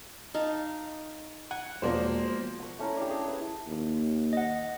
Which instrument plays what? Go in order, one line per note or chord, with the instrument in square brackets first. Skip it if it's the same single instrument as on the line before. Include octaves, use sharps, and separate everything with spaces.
[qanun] D#4 F5 A5
[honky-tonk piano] F#5 [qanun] G#5
[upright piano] E1 D5 [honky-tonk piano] F3 A#3 C5
[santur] F#5 C#6
A3 C#4 E4 A#5
D4 G4
C#4 G#4 F#5
B4 E5
[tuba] D#2
[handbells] D#5 F#5